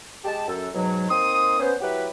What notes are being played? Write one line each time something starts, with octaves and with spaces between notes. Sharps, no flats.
G#3 G4 A5
F#2 A4
G#2 B2 F#3
A#3 C4 D#4 C6 D#6
B3 C#4 C5
F#3 E4 F#4 G4 B4